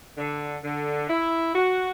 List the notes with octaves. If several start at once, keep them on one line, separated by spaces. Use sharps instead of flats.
D3
D3
E4
F#4